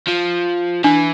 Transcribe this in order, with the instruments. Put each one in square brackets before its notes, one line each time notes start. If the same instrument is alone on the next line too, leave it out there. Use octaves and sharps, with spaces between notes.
[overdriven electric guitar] F3
[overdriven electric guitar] E3 [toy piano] D4